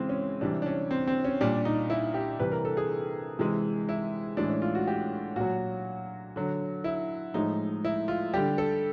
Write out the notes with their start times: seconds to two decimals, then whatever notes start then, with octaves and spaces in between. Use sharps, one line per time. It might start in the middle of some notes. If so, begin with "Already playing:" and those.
Already playing: C#3 E3 G#3 C4
0.09 C#4
0.41 C3 E3 G3 D4
0.62 D4
0.66 C#4
0.91 C4
1.07 C4
1.24 C#4
1.41 A#2 G3 D4
1.65 D#4
1.90 E4
2.14 G4
2.39 C3 E3 G3 B4
2.52 A#4
2.65 A4
2.77 G#4
3.39 C3 E3 G#3
3.89 E4
4.37 A2 E3 G#3 D4
4.49 C#4
4.62 F4
4.75 F#4
4.87 G4
5.36 A#2 F#3 F#4
6.36 D3 F#3
6.84 E4
7.34 A2 F3 G#3 D#4
7.84 E4
8.08 F4
8.34 D3 G3 G4
8.58 A4